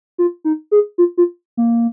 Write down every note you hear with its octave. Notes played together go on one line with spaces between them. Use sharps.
F4
D#4
G#4
F4
F4
A#3